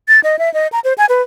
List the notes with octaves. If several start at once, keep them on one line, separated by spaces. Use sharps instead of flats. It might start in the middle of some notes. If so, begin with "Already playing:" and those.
A6
D#5
E5
D#5
A#5
C5
G#5
B4